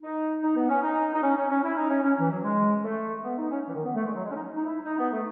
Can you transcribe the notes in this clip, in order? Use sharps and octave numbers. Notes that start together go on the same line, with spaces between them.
D#4
D#4
B3
C#4
D#4
D#4
C#4
C#4
C#4
E4
D#4
C#4
C#4
E3
F#3
G#3
A3
B3
D#4
C#4
E3
D#3
B3
A3
G#3
F#3
G#3
C#4
D#4
D#4
E4
D#4
B3
A3